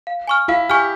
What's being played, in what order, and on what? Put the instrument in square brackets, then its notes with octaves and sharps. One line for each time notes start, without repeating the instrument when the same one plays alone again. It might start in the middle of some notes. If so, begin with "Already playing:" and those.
[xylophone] F5
G#5 C#6 F6
[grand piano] E4 [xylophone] F5
[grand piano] G4 [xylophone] G#5 C#6 F6